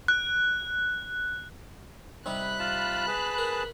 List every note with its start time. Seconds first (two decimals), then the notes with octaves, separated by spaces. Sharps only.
0.08 F#6
2.26 C3 G3 D#4 B5 F#6
2.59 F4 A5
3.08 G#4 B4 A5
3.38 A#4